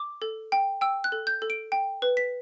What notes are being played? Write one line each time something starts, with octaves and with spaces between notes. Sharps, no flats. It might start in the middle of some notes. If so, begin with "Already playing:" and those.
Already playing: D6
A4
G5
G5 E6
F#6
A4
G6
A4
D7
G5
B4
B6